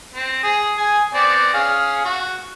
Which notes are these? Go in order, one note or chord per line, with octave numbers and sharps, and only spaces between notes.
C4
G#4
G#4 G#5
B3 C4 D5
C#4 G#4 F5
F#4